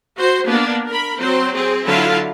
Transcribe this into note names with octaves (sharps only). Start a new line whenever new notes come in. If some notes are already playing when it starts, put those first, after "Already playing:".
F#4 C5
A#3 B3 D4
A#4 B5
F#3 C4 C5
C4 G#4
D3 F#3 E4 F4 F5 A5